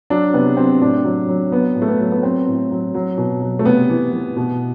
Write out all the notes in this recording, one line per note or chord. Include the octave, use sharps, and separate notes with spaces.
F#3 D4
C3 B3
F#3 C4
A2 D4
F#3
F#3
F#3 B3
A2
A3
B3
F#3
B3
F#3 C4
A2
F#3
F#3
B2
F#3
A3
C3 B3
E3
E3
B2